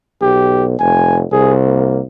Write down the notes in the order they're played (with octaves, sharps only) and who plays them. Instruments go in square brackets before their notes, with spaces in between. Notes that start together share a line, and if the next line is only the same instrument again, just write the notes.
[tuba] B1 [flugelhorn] G4
[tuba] F1 [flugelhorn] G#5
[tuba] C2 [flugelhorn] G#4
[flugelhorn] A#3